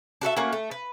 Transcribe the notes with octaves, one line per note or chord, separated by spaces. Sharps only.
D4 F#4 A4 E5
A3 A#3 C#4 F#4
A3
B4